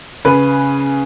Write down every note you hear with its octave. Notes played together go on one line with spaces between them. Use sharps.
C#3 B4